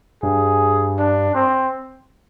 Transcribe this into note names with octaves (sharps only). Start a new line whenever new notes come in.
G2 G#4
D4
C4